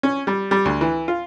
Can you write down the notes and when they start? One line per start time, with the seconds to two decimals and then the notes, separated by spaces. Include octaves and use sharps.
0.03 C#4
0.27 G3
0.51 G3
0.65 D2
0.81 E3
1.08 F4